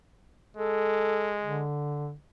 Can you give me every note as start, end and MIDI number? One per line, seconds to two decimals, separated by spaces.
0.57 1.64 56
0.57 1.36 69
1.43 2.14 50